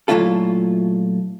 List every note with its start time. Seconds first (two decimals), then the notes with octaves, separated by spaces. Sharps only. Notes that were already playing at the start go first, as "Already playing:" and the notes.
0.08 A#2 F#3 A3 E4 F4 A4